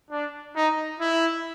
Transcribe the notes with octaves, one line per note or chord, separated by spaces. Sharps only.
D4
D#4
E4